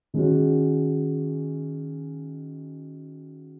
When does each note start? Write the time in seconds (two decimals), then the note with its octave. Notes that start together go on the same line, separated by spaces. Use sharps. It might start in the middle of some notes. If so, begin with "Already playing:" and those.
0.14 D#3 G#3 C#4 F#4